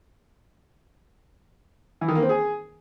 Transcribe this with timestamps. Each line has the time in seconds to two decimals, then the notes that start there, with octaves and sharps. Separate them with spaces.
2.01 E3
2.08 D#3
2.15 A#3
2.22 C4
2.29 G#4